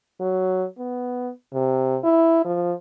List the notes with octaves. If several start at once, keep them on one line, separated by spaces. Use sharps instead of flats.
F#3
B3
C3
E4
F3